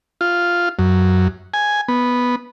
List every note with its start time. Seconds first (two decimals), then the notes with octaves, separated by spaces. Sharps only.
0.21 F4
0.79 F#2
1.54 G#5
1.88 B3